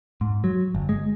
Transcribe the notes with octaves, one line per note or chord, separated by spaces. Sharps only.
G#2
F#3
G1
G#3